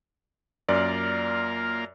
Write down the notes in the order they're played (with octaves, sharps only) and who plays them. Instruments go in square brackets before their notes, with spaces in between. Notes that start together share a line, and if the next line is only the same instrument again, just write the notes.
[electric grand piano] F#2 D5 [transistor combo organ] A#3 F4 A#4